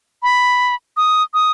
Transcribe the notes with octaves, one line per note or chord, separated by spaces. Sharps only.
B5
D#6
D#6